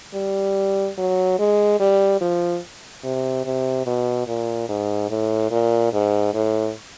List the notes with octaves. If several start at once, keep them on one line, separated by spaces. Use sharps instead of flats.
G3
F#3
G#3
G3
F3
C3
C3
B2
A#2
G#2
A2
A#2
G#2
A2